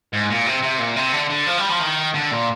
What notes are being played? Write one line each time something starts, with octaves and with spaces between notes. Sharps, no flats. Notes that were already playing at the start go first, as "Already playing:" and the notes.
G#2
A#2
C3
C3
A#2
C3
D3
D3
F3
G3
F3
D#3
D3
A#2